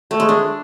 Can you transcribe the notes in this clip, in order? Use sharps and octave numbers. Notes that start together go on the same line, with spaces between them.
A3
G#3
D4